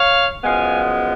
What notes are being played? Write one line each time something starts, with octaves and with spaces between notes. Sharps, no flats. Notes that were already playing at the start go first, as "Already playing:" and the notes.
Already playing: C#5 F5
F#2 F3 G#3 B3 F5 G#5